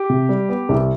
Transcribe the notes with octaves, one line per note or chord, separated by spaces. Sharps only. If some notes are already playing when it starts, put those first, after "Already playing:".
Already playing: G4
C3
G3
B3
C2